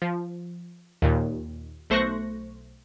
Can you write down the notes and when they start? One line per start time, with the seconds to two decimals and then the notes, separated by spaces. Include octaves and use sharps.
0.02 F3
1.02 D#2 A#2
1.90 B1 A3 C5 C#6 F#6 A#6